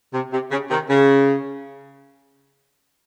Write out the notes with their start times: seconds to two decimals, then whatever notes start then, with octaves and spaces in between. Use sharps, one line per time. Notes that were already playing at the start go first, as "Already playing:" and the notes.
0.14 C3
0.33 C3
0.51 C#3
0.70 C3 D#3
0.90 C#3